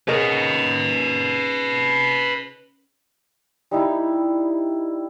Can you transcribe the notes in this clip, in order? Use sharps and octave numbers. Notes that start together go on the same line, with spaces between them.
C#3 D#4 A#4 B4 D#5
G3 D#4 E4